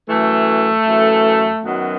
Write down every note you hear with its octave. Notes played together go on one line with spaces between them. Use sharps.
F#2 E3 A3
F#2 E3
F#2 D#3 F#3 B3